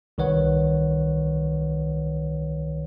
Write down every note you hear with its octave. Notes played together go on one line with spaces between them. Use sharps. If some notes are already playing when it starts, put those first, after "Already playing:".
C2 D#3 B4 C#5 F#5